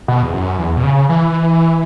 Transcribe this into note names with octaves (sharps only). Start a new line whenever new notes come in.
B2
E2
F#2
E2
B2
C#3
E3